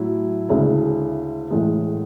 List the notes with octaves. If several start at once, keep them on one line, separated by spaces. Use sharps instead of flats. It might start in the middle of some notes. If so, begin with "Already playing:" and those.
Already playing: A2 F#3 E4
D2 C#3 G#3 C#4 E4
A1 A2 G#3